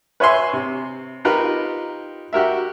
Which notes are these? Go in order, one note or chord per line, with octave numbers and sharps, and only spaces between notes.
B4 C#5 E5 G#5 C6 C#6
C3
D#4 F4 G4 A#4 B4 A#5
F#4 G4 A#4 E5